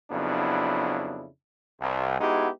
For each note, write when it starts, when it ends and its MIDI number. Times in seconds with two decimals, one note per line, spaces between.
0.11 1.26 41
0.11 1.26 49
0.11 1.26 54
0.11 1.26 59
0.11 1.26 62
0.11 1.26 64
1.80 2.16 36
2.19 2.48 56
2.19 2.48 59
2.19 2.48 63
2.19 2.48 64
2.19 2.48 66
2.19 2.48 67